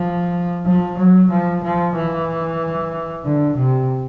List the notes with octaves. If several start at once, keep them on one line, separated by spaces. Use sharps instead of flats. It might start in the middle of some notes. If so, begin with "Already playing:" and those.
Already playing: F3
F3
F#3
F3
F3
E3
D3
C3